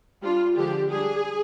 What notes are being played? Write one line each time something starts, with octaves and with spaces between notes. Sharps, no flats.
G3 D4 F4
D3 F3 G#3 D4 G4
G3 D4 G#4